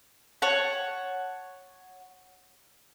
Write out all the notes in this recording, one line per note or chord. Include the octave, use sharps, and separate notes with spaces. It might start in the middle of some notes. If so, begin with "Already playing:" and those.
C#5 F#5 A5